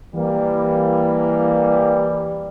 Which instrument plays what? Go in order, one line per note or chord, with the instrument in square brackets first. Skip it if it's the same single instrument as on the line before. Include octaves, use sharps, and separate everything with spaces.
[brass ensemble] E3 G3 A#3